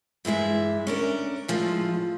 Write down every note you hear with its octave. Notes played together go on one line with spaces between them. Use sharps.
G2 E3 G#3 E5
C#4 D4 A#4
A2 F3 G#3